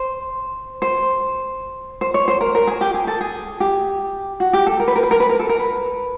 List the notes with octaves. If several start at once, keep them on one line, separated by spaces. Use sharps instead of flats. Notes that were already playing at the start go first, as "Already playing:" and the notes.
Already playing: C5
C5
C5
C#5
C5
A#4
A#4
G#4
G4
G#4
A4
G#4
G4
F#4
G4
A4
A#4
B4
A#4
B4
A#4
B4
A#4
A4
A#4
B4